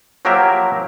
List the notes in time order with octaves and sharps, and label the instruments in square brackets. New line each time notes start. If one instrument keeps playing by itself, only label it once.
[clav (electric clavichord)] F3 F#3 A#3 G4 A#4 E5